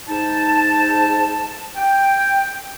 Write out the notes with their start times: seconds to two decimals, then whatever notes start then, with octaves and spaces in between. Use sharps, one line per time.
0.08 G#2 D#4 A5
1.76 G5